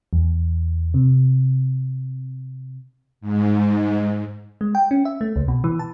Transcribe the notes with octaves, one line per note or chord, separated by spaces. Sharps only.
E2
C3
G#2
G#3
G5
C#4
E5
A3
C#2
B2
E3
A5